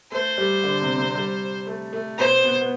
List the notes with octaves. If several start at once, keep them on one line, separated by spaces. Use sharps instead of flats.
A3 A4 C5
G3 G4
D3 D4
C3 C4
C3 C4
G3
A3
A3
B2 B3 C5
B2 B3
B3